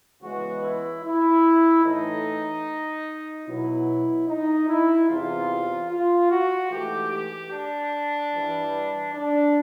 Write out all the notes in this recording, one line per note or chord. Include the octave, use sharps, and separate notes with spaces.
C#3 E3 G#3 B3 F#4
E4
E4
A2 E3 A3 D#4
B2 F#3 B3 E4
D#4
E4
E2 C3 E3 F4
F4
F#4
G#2 E3 A3 G4
G4
D4
G2 E3 G3
D4